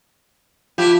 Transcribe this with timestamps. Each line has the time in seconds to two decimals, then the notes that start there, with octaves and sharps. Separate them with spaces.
0.78 F3 E4 F4 G4